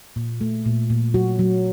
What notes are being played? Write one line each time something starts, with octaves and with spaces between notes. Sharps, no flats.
A#2
A3
A#2
A#2
F#3 F#4
F#3